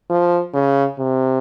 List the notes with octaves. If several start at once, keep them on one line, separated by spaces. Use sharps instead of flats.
F3
C#3
C3